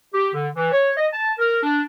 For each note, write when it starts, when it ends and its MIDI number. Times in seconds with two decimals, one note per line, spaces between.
0.14 0.29 67
0.34 0.48 50
0.56 0.72 52
0.72 0.92 73
0.97 1.07 75
1.12 1.33 81
1.39 1.59 70
1.63 1.81 62